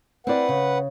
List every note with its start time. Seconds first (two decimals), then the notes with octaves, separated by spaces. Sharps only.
0.27 C4 E4 B4 D5 F#5
0.49 C#3